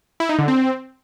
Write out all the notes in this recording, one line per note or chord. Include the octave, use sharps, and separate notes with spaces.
E4
D#4
D3
C4